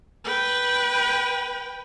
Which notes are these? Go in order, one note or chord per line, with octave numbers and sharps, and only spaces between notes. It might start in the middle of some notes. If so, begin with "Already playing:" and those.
B4 G5